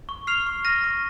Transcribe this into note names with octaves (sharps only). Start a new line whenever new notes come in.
C#6
F6 C7 F7
C#6
F6 A#6 D#7
C#6